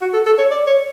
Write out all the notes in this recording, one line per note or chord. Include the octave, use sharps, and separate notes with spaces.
F#4
A4
A4
C#5
D5
C#5